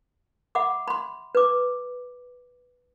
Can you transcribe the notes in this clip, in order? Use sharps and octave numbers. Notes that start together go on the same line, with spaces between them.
E5 F#5 B5 D6
B5 C6
B4 D6